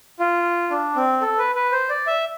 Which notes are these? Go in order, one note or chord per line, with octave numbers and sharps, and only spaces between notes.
F4
D4
C4
A4
B4
B4
C5
D5
E5